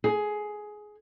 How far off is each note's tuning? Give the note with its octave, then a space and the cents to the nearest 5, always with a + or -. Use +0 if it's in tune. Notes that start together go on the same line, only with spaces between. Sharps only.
G#4 +15